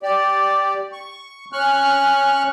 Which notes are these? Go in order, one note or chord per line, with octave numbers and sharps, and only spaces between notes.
G4 D5
C#6
C#4 C#6 F6 F#6